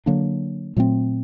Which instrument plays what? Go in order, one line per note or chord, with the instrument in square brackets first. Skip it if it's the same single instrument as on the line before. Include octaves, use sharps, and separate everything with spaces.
[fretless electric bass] D3 F#3 A#3 D4
A#2 F#3 A3 C4